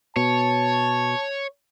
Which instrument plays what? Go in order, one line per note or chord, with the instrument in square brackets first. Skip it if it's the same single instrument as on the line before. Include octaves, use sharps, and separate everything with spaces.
[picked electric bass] B2 [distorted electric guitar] C#5 [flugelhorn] A5